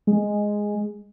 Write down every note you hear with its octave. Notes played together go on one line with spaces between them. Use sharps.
G#3